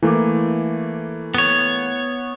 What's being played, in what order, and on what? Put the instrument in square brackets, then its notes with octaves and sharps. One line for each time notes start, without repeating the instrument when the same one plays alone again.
[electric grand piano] E3 A3 A#3 [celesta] E4 D6
[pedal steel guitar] B3 C#5